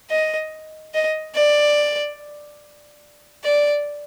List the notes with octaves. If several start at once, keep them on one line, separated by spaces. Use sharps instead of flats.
D#5
D#5
D5
D5